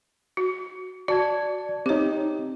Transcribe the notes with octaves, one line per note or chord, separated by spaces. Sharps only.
F#4
F#4 D5 A5 G#6
C4 D#4 G4 C#5